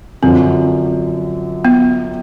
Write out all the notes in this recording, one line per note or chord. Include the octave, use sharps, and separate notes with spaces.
F#2 D3 F3 C4
B3